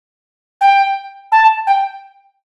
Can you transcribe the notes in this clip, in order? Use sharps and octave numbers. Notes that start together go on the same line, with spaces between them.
G5
A5
G5